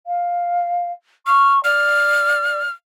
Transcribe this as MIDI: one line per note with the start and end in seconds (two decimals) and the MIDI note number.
0.07 0.92 77
1.27 1.62 85
1.27 1.53 89
1.64 2.63 74
1.64 2.71 89